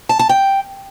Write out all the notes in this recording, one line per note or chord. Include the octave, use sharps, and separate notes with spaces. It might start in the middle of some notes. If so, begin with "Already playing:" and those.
A5
A5
G5